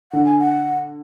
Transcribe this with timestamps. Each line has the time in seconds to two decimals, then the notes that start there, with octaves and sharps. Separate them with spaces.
0.12 D3 F#5
0.25 G#5
0.39 F#5